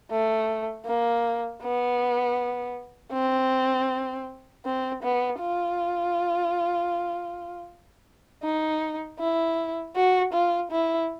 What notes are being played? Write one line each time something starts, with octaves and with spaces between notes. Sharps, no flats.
A3
A#3
B3
C4
C4
B3
F4
D#4
E4
F#4
F4
E4